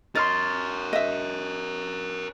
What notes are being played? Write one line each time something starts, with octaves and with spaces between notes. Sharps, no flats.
A#4 C#5 D#5 C6 F6 A6
D#5 E5